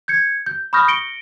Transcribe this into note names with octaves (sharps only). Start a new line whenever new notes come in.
G6 G#6 C#7
G6
B5 C#6 D#6 F6 G6 A#6
A#6 C#7 D7 G7